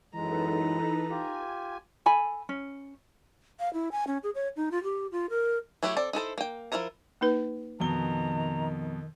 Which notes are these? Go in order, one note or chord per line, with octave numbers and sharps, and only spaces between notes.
F#2 E3 G#3 D#4 A4 B4 A#5
F4 G4 G#5
A4 G#5 B5
C#4
F5
E4
G#5
C#4
G#4
C#5
D#4
F4
G4
F4
A#4
F#3 A3 E4 F#4 G4
C4 A4 D5
D#4 E4 A4 C5
A#3 G5
F3 A#3 E4 A#4 A#5
A#3 D#4 B4
F2 B2 D#3 A#5 G7